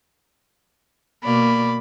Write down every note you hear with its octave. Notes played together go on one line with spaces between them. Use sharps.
B2 A#3 D5 B5